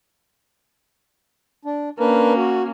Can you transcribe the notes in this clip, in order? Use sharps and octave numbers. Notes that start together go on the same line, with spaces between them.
D4
A#3 C#4 D4 A#4 B4
F#4